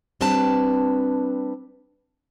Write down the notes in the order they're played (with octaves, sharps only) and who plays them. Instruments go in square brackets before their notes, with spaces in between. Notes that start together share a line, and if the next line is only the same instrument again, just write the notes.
[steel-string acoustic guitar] G3 C4 D4 B4 A5